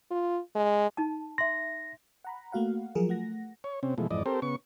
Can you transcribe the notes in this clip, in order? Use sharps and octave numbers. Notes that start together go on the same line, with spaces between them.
F4
G#3
D#4 A5
E5 C6 A#6
F#5 A#5 B5
A3 A#3 F#4 F5 F#5
F3 F#3 F4 G#4 A#4
A3 F#5 A#6
C#5
C3 C4 C#4
B2 E3 F3 G#3 A3
F2 G#2 E3 D5 D#5
C4 G4 A4 A#4 C5
C#3 B3 C#6